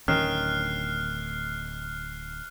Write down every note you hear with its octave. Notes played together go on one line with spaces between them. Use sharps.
D1 D#3 C#4 F6 F#6 C7